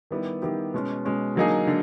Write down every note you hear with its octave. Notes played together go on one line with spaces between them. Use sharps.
D#3 G3 B3 E4 G4
D#3 G3 B3 E4 G4
B2 G#3 C#4
B2 G#3 C#4
D3 F#3 A#3 D#4 G#4
D3